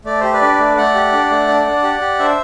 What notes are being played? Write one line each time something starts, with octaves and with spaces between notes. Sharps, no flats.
A3 D5
G4 C5
B4 D5
D4
A3
A3 D5 F#5
G4
D4
A3
D4
D4
G4
G4
D4 C5 E5